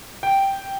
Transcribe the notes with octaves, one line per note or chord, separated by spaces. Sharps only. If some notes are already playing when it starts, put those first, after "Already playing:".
G5